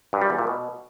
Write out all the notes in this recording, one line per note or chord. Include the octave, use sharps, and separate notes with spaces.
G2
G3
E2
A#2
B2